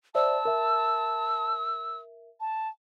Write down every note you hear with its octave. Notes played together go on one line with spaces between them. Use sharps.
C5 D5 E5 A5 E6
A#4 E5
A5